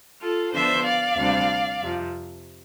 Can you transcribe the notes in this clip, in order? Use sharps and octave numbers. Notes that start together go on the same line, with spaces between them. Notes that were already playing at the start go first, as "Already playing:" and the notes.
F4 A4
D3 F3 B3 D4 C5 E5
D5 F5
D2 C3 G3 D4
F2 C3 F3